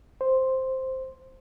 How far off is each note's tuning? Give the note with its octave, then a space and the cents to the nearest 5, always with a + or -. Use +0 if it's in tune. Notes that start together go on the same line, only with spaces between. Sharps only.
C5 +0